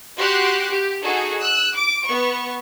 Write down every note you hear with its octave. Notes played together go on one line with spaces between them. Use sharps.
F#4 G4 C6 D6 F#6
G4
D#4 F#4 G#4 A4
E6 F#6
D6 D7
B3 C#6